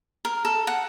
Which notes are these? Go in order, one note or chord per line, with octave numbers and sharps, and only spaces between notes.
A#4
A4
F#5